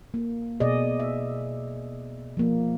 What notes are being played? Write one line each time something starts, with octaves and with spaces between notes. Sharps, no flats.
A#3
B2 G#4 D5 D#5
E5
F3 A#3